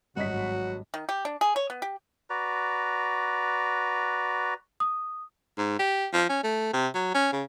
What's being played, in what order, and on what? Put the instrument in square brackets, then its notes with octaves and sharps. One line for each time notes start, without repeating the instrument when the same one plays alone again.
[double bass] G#1 [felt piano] G2 D#5 B6 [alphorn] F#3 [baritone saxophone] F#4
[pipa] D#3
G4
D4
G#4
C#5
B3
G4
[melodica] F#4 B4 D5 A#5
[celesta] D#6
[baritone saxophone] G#2
G4
F3
C#4
A3
C3
F#3
C#4
C#3